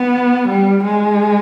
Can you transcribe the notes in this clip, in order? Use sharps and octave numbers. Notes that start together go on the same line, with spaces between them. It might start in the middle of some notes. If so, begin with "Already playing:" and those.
Already playing: B3
G3
G#3